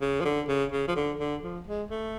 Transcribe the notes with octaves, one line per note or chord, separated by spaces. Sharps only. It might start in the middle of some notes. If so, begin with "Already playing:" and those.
C#3
F3
D3
C#3
C#3
F3
D3
D3
F3
G#3
A3